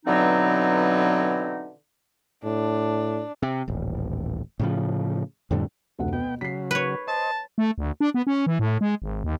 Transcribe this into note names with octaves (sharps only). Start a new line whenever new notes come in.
B2 D3 E3 F#3 C4 D#4
A2 D4
C3
D#1 A1
A2 C#3 F3
F2 A2 D3 G3
F1 D2 F#5
B2 B3 G5
C#3 F#3 B6 C7
B4 C#5
C5 D#5 A5
A3
D2
D4
B3
C#4
E3
A2
G#3
G#1
D#2